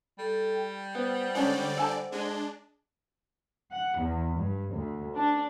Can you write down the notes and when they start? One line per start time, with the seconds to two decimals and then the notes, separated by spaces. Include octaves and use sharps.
0.19 G3 A4
0.54 G5
0.95 B3 C5 F#5
1.35 D3 G#3 C#4 D4 D5
1.77 A4 G#5 A5
2.12 G#3 D4
3.71 F#5
4.01 E2
4.40 G2
4.76 D2
5.17 D4